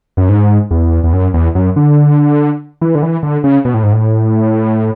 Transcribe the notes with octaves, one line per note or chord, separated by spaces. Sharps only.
F#2
G#2
E2
E2
F#2
E2
F#2
D3
E3
D3
E3
D3
C#3
B2
A2
G#2
A2